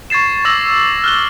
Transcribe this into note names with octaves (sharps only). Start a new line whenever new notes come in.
C#6 G#6 A6 C7 E7
C#6 D6 E6 A6 A#6 F#7
F6 F#6 G7